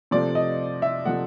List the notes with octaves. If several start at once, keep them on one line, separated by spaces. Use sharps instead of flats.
C3 F3 A3 D5
D#5
E5
C3 F3 A3 F#5